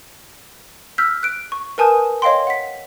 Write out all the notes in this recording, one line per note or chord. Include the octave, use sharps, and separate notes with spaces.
E6 F6 G6 B6
F#6 D7
C#6
A#4 B4 G#5 A5 D#6 G6
C#5 D#5 F5 G5 C6
F#5 B6